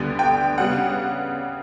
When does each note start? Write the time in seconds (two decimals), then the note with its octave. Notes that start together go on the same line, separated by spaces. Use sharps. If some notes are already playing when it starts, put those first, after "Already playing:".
Already playing: D2 D3 G3 B3
0.19 G5
0.58 C#3 G3 B3 F#5